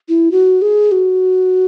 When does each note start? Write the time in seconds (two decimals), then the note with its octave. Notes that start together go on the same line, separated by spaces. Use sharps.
0.09 E4
0.31 F#4
0.62 G#4
0.92 F#4